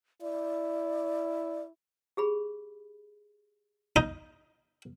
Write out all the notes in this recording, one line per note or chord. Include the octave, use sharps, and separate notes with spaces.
E4 D5
G4 G#4 B5
D#4